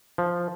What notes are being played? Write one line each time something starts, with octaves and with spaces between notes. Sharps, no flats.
F3